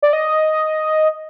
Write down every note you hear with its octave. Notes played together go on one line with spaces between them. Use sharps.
D5
D#5